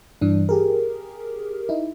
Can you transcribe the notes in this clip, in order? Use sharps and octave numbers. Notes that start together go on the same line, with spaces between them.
G2 E3 D4
G4 G#4 A#4
D#4 E4